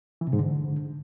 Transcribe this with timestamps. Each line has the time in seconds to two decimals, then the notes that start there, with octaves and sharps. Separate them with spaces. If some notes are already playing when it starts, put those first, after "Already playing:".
0.21 E3
0.27 C3
0.33 G#2
0.39 D3